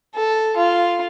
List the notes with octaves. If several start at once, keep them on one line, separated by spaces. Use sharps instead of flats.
A4
F4